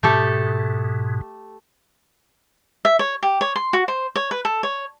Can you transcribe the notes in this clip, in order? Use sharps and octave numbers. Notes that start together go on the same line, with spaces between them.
G#2 B2 A3 G4 A4
E5
C#5
G4
C#5
C6
F#4
C5
C#5
B4
A4
C#5